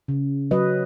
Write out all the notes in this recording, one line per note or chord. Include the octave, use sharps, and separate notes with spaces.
C#3
F#3 B4 D#5